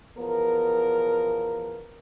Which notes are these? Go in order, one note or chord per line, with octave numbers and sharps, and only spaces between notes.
E2 F3 B3 A#4